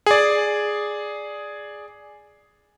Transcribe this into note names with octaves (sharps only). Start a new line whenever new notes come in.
G#4 D5